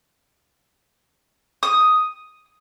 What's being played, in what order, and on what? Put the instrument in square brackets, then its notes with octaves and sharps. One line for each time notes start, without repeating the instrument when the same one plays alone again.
[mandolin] D#6